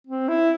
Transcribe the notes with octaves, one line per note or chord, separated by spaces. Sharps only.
C4
E4